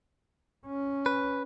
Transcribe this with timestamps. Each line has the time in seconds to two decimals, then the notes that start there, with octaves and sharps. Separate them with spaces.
0.66 C#4
1.06 B4